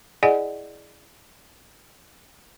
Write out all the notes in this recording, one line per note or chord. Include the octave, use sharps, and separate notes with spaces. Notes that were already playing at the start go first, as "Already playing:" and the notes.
E4 G#4 D5 D#5 F#5 G#5